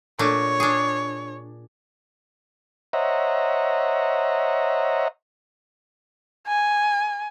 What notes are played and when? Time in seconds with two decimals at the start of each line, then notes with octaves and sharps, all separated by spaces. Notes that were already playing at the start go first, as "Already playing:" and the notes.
0.19 A#2 A3 D4 C#5
0.60 D4 G#4
2.93 C5 C#5 D#5 E5 F#5 A#5
6.47 G#5